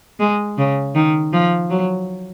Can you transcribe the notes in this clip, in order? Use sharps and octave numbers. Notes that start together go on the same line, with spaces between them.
G#3
C#3
D#3
F3
F#3